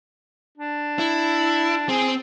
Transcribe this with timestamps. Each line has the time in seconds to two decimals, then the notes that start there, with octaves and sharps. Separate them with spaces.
0.58 D4
0.99 E4
1.89 C4 G#4